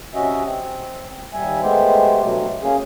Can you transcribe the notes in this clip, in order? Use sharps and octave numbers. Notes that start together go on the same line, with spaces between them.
C3 C#4 F#4 D#5 E5
C4
D#2 G3 E5 G#5
G#3 A3 B3 G4 C5
G2 B2 F#3 A3
A#3 C#4 G#4